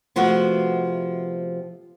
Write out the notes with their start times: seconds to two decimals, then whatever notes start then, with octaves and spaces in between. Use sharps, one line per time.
0.16 C3 F3 A3 B3 F#4